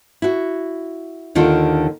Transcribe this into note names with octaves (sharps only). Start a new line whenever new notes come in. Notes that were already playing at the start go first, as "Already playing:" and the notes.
E4 F#4
D#2 D3 D#3 F4